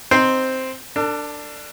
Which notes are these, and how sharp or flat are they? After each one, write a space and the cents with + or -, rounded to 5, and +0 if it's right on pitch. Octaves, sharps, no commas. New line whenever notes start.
C4 +0 D#4 +0 C5 +0
D4 +5 A4 +45